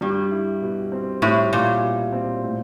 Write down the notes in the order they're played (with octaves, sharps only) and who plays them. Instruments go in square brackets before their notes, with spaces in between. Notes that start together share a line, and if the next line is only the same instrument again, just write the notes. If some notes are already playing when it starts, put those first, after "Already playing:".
[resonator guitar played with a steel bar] G2 [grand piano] G3
[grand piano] E4
B2
C4
[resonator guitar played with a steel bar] A2 [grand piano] G3
[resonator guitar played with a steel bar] A#2 [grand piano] E4
[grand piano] B2
C4
A2